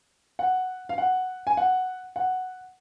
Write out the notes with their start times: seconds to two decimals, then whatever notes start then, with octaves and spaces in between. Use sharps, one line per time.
0.39 F#5
0.89 F5
0.98 F#5
1.47 G#5
1.57 F#5
2.16 F#5